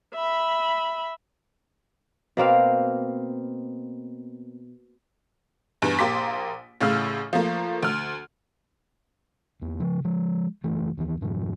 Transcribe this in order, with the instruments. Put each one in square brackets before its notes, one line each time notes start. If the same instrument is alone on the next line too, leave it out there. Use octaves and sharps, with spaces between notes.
[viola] E5 B5
[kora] B2 A#3 C4 F5
[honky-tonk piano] E2 G2 B4 D7
A#1 A#3 G4 C6 D6 B6
A1 A2 C#3 F5 E6 F6
F3 A3 A#3
D2 F6
[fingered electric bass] E2 A#3
C#3 F3
F3 G#3
F#1 E3 A3
D#2 E3
F2 G#2 C3 F3